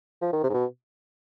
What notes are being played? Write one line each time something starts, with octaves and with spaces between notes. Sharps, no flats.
F3
D#3
C3
G#2
B2